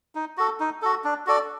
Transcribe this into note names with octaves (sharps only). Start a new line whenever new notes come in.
D#4
F#4 A4
D#4
F#4 A4
D4
F#4 A4 D5